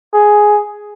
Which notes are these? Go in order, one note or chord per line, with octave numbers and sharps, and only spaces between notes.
G#4